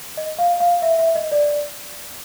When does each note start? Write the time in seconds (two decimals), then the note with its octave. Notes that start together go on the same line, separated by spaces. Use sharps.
0.17 D#5
0.39 F5
0.60 F5
0.82 E5
0.99 E5
1.15 D#5
1.32 D5